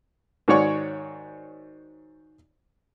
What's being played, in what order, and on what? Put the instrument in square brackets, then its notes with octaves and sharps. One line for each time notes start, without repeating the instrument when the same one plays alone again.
[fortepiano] G#2 D#3 F#4 C#5 D5 C#6